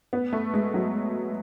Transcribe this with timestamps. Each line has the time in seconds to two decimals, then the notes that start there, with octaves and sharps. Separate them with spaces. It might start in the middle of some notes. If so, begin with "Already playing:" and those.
0.13 B3
0.33 A3
0.54 G#3
0.74 F#3